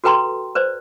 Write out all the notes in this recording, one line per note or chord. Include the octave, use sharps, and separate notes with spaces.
F#4 A4 B4 G5 A#5 C6
B4 C5 D5